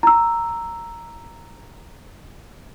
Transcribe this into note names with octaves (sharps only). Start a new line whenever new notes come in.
A#5 E6